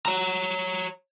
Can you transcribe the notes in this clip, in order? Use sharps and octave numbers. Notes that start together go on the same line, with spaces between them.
C#5 A#5